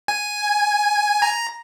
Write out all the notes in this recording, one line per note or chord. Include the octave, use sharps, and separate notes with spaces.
G#5
A#5